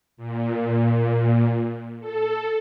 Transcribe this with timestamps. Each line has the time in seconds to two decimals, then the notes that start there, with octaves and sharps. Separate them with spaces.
0.17 A#2
2.00 A4